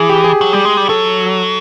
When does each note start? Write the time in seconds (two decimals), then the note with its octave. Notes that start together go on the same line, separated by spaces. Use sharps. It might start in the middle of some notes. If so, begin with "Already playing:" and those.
Already playing: E3 G#4
0.10 G4
0.24 G#4
0.41 F#3
0.53 G3
0.65 G#3
0.77 G3
0.89 F#3 A4